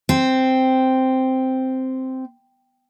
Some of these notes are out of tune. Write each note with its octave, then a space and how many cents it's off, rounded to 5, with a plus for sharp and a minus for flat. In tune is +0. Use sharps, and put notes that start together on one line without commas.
C4 -5